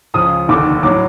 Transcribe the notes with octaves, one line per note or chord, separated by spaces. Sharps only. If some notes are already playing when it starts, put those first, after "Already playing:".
C#2 C#3 F3 D#6
F1 D#2 D3 D6
A2 F#3 D6